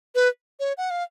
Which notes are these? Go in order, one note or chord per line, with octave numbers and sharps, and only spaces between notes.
B4
C#5
F#5
F5